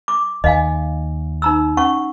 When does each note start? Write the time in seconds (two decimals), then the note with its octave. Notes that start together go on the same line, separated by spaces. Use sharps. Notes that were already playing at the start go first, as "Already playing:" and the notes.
0.08 D6
0.44 D#2 D#5 F5 G#5
1.42 D#4 A#5 E6
1.77 C#4 F#5 C#6